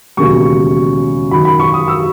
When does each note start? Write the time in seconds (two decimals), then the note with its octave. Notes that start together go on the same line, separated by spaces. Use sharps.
0.17 E1 D#2 C#3 F#3 C#6
1.31 F#2 D#3 F#3 B5
1.45 B5
1.60 C#6
1.74 D#6
1.88 E6